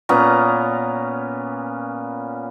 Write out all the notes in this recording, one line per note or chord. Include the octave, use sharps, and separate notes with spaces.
A#2 B3 C#4 A#5